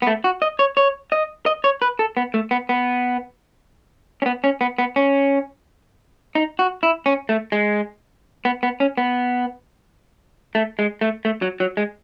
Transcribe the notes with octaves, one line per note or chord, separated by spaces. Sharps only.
B3
A3
F#4
D#5
C#5
C#5
D#5
D#5
C#5
B4
A4
B3
A3
B3
B3
C#4
B3
C#4
B3
B3
C#4
D#4
F#4
E4
C#4
A3
G#3
B3
B3
C#4
B3
A3
G#3
A3
A3
F#3
F#3
G#3